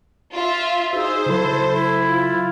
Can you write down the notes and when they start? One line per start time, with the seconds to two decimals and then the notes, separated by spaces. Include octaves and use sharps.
0.33 F4 E5
0.93 D#4 F#4 G#4 C5 E6
1.26 C#3 F#3 E4 A4
1.72 E4
2.07 F4